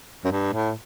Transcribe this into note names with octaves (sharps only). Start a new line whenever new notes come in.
F#2
G2
A2